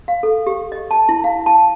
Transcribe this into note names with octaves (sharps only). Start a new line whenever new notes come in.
F5
A4
G4
D#5
A5
E4
F5
A5